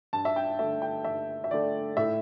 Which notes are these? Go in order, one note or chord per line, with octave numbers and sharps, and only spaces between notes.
G2 A5
E5
G5
D3 A3 E5
G5
G2 E5
E5
D3 A3 D5
A2 E5